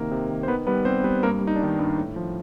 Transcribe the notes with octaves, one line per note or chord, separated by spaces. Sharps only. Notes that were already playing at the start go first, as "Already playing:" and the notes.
Already playing: C3 D#3 A#3 A#4
C3
D#3
C5
D#3 B3 B4
G3 B3 B4
G3 C4 C5
G3 B3 B4
G2 A#3 A#4
G2
D#4
D4
G2 D#3 D#4
G2
A2
F3